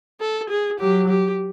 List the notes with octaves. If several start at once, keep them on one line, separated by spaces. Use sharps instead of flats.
A4
G#4
F#3 G4
G4